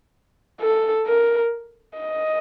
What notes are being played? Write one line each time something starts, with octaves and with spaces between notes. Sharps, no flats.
A4
A#4
D#5